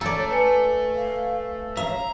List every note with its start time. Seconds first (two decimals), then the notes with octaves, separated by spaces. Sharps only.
0.01 A3 A4 D5 A#5
0.31 B4 G#5 C#7
0.96 F5
1.77 E5 F5 A#5